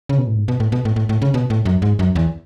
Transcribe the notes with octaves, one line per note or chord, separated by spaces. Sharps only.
C#3
B2
A2
G#2
B2
A2
B2
A2
A2
A2
C#3
B2
A2
F#2
G#2
F#2
E2